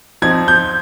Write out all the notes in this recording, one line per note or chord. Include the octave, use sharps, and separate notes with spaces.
F3 C4 D#4 G#6
G6